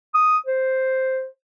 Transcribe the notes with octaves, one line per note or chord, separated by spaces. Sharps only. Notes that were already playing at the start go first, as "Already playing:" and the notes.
D#6
C5